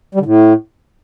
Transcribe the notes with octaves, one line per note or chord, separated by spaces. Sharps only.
G3
D3
A2